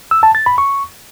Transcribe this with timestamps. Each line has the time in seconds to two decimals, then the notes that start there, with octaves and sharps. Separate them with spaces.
0.11 E6
0.23 A5
0.35 A6
0.46 B5
0.58 C#6